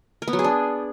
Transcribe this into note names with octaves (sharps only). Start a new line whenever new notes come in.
A#4
B3
F#3
G#4
D4